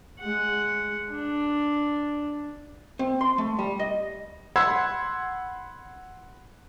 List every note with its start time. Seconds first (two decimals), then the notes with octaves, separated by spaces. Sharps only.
0.20 G#3 F#5
1.11 D4
2.99 C4
3.21 C6
3.38 A3
3.59 G3
3.80 D#5
4.56 F#5 B5 C6 E6 G#6